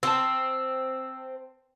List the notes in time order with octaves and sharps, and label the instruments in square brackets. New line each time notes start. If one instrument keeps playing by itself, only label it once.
[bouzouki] C4 [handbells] A5 E6